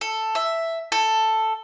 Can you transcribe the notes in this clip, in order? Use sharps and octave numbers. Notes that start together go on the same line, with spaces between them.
A4
E5
A4